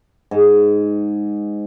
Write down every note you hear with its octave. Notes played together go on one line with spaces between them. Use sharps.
G#2